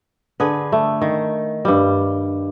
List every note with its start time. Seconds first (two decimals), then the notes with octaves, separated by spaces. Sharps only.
0.40 D3 G#4 B4
0.72 A3
1.02 D#3
1.65 G2 G3